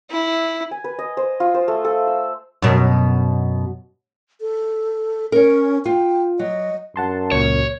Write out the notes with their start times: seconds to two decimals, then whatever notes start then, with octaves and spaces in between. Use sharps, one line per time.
0.11 E4
0.71 G#5
0.84 B4
0.99 D#5
1.17 C5
1.40 F4
1.54 C5
1.68 A3
1.84 A4
2.07 E6
2.62 F#2 B2
4.41 A4
5.32 C#4 A#4 C#5
5.85 F4 G5
6.39 F#3 D#5
6.96 F#2 F#5 A5 C6
7.32 C#2 A#2 C#5